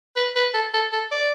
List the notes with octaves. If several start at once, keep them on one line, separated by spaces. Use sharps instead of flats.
B4
B4
A4
A4
A4
D5